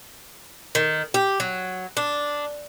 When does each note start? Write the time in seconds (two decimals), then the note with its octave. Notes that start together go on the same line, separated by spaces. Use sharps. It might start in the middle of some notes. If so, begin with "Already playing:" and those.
0.75 D#3
1.14 G4
1.40 F#3
1.97 D4